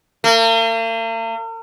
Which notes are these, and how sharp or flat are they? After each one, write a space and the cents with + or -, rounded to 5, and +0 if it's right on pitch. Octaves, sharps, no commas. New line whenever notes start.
A#3 -45